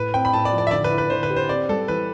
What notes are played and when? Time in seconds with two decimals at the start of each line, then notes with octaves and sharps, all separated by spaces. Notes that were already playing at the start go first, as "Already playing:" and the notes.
Already playing: A2 B4
0.14 C4 G5
0.25 B5
0.33 A2 A5
0.45 D5
0.52 F3
0.58 D5
0.67 E5
0.71 D3 D5
0.84 B4
0.91 E4
0.98 B4
1.10 D3 C5
1.23 B4
1.30 G4
1.36 C5
1.49 C4 D5
1.69 G3 A4
1.88 E3 B4